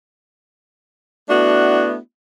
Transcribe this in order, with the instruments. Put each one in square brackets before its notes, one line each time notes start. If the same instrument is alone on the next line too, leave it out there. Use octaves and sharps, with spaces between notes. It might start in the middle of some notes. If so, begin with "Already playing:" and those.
[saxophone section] A3 B3 D4 E4 F#4